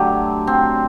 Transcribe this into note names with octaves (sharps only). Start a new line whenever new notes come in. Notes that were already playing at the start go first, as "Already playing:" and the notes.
Already playing: D3 F#3 A3 G4
C4